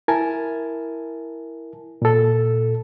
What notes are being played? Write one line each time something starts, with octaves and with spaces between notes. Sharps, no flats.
E4 A#4 G#5 A5
A#2 A4